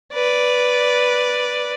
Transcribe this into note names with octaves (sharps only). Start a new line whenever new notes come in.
B4 D5